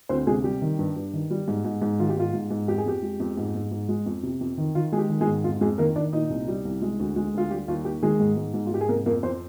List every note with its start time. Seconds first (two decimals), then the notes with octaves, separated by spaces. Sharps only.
0.09 D2 C4 C5
0.27 C3 G#3 G#4
0.44 G3 G4
0.62 D#3
0.79 G2
0.96 G2
1.13 D#3
1.30 G3
1.48 G#2
1.65 G#2
1.82 G#2
1.99 D#3 F4
2.09 G4
2.17 G#2 F4
2.34 G#2
2.51 G#2
2.68 F2 G4
2.78 G#4
2.86 F2 G4
3.03 G#3
3.20 F2
3.37 G#2
3.55 G#2
3.71 G#2
3.89 G#3
4.06 F2
4.23 C3
4.41 F2
4.58 D#3
4.75 D#3 F4
4.92 G#3 G#4
4.98 G4
5.10 D#3
5.21 G#3 G#4
5.27 G#2
5.44 F2 F4
5.61 F2 G#3 G#4
5.78 D#3 A#3 A#4
5.96 D#3 D4 D5
6.13 A#2 D#4 D#5
6.30 C2
6.48 G3
6.65 C2
6.82 G#3
6.99 D2
7.16 G#3
7.34 D2 F4
7.51 G3 G4
7.68 D#2 F4
7.85 D#2 G4
8.02 D#3 G#3 G#4
8.20 G#2
8.37 G#2
8.54 G#2
8.66 F4
8.71 G#2 G4
8.81 G#4
8.88 C3 A#3 A#4
9.06 F2 A#3 A#4
9.23 F2 C4 C5